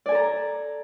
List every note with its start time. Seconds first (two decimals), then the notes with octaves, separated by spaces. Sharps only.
0.06 D5
0.09 G#5
0.12 A4
0.15 A#5